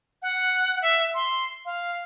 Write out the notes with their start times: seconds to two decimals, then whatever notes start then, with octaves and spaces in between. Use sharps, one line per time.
0.22 F#5
0.82 E5
1.14 C6
1.65 F5